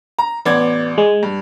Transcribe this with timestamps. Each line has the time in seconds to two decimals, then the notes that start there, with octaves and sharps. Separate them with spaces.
0.19 A#5
0.46 A1 B3 D5 G#6
0.98 G#3
1.23 G2